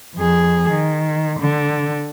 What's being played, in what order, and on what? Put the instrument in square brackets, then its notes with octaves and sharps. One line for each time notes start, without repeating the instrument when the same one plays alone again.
[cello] F2 G#4
D#3
D3